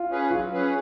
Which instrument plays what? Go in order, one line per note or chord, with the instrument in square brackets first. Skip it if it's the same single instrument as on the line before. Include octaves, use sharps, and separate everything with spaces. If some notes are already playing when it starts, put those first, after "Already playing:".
Already playing: [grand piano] F4
[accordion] C#4 G#4 B4
[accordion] F#3 [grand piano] F4
[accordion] C#4 G#4 B4